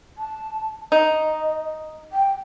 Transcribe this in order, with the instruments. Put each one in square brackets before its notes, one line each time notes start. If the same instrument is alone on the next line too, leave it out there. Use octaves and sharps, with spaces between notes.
[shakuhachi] A5
[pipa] D#4 [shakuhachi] D#5
[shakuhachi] G5